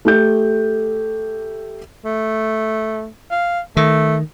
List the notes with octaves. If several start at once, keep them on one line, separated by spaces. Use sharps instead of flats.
A3 G4 G6
A3
F5
D#3 A3